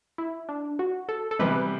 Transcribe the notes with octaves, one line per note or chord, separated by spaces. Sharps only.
E4
D4
F#4
A4
A4
C3 E3 G3 B3 B4